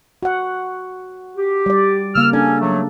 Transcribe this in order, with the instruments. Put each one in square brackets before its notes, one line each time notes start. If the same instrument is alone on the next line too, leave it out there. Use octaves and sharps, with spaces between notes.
[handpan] F#4 F#5
[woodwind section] G4
[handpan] G3 D5
[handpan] C#3 A#3 [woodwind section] E6 F6
[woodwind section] C#4 [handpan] D4 A4
[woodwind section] F#3 A3